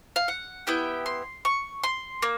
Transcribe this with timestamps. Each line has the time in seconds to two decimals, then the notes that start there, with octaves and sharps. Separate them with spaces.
0.16 F5
0.28 F#5
0.67 B3 E4 G4 G5
1.06 C6
1.45 C#6
1.83 C6
2.22 A#3